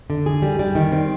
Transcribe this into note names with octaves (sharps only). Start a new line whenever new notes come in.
D3
G#4
G3
G3
D#3
C4